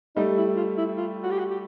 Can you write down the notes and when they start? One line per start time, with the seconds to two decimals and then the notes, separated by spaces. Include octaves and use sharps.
0.16 G3 A3 D#4
0.37 E4
0.56 F4
0.77 E4
0.97 F4
1.24 F#4
1.31 G4
1.39 F#4
1.50 G4